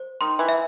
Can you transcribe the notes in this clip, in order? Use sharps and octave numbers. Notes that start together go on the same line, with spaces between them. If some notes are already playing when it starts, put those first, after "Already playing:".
Already playing: C5
D#3 C6
E3
E5